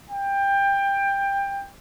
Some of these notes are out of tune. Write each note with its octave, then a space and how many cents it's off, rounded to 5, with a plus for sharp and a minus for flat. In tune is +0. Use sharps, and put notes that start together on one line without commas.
G5 +20